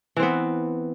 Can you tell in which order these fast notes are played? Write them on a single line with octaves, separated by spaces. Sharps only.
E3 C4 B3